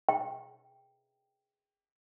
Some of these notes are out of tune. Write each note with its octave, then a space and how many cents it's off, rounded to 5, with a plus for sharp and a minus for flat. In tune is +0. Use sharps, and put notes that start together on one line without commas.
G5 +0